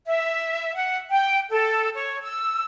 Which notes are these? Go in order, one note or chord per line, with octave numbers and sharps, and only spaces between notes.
E5
F#5
G5
A4
C#5
E6